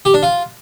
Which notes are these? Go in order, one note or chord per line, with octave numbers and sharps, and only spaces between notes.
G4
D4
F4